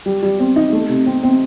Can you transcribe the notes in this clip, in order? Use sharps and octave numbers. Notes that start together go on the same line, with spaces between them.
G3
G3
C4
D#4
A3
C3
C4
C4